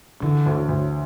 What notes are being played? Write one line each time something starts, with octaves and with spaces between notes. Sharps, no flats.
D3 E3
D2
D2